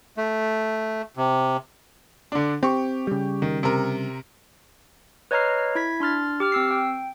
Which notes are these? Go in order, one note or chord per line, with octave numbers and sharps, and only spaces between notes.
A3
C3
D3 D4
C4 G4 C#6
C#3 G3
D#3
C3 A#4
B4 C#5 D#5 A#5 F6 C7
E4 G#6 B6
D4 C6 F6 A6
G4 D6 F6
C4 E6 C7
G5